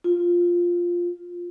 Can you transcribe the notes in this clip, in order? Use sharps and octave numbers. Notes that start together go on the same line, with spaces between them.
F4